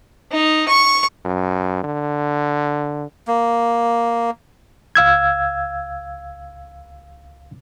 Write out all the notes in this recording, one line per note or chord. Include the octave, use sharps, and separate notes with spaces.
D#4
C#6
F#2
D3
A#3
C#2 F5 E6 G#6